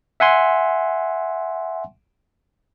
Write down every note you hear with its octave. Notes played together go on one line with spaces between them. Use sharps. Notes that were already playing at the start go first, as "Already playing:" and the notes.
E5 F#5 G#5 C6